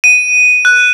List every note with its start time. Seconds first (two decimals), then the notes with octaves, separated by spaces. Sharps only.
0.04 D#7
0.65 F#6